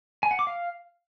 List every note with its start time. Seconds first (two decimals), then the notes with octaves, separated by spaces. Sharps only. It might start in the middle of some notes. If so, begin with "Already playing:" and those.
0.23 G#5
0.31 F#5
0.39 D6
0.47 F5